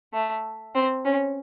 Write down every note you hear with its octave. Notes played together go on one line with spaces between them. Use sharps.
A3
C4
C#4